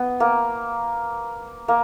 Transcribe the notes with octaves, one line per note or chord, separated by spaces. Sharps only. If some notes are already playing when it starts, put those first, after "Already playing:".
Already playing: B3
A#3
A#3